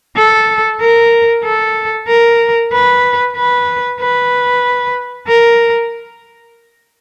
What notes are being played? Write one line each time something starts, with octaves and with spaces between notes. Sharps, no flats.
A4
A#4
A4
A#4
B4
B4
B4
A#4